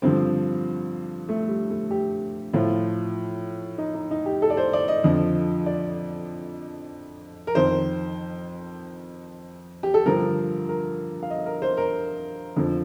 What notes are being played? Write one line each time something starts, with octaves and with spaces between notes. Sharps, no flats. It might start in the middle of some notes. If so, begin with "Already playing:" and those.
G2 D3 F3 C4
A3
G3
A3
G4
A2 F3 F4
D#4
D#4
D#4
G4
A4
D5
C5
D5
D#5
F2 D3 F3
D5
A#4
F2 D#3 C5
G4
A4
G2 D3 F3 A#4
A#4
F5
D#5
A#4
C5
A#4
F2 D3 F3